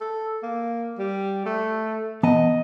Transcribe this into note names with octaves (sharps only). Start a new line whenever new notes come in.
A4
A#3
G3
A3
E3 B3 D#5 A5